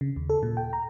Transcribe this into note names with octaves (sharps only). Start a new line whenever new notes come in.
C#3
D#2
A4
A#2
G5
A#5